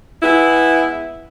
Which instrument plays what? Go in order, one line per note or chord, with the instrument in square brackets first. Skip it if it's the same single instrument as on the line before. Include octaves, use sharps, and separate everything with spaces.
[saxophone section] G#3 B3 E4